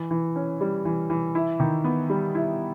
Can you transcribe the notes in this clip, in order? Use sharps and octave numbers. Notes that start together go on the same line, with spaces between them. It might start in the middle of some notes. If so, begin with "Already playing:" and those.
Already playing: E3
E3
C#4
G3
E3
E3
E4
D#3
B3
G3
E4